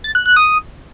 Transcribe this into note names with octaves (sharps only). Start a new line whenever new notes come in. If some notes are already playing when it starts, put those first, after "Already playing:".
A6
F#6
F#6
D#6